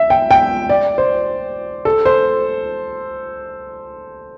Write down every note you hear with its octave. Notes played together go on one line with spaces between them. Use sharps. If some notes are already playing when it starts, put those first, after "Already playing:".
Already playing: E5
G5
G5
D5
C5
A4
C5